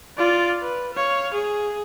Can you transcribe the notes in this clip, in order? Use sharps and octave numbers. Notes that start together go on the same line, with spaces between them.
F4 D5
B4
C#5 F5
G#4